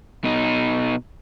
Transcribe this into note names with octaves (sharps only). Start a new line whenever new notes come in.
B2 D#4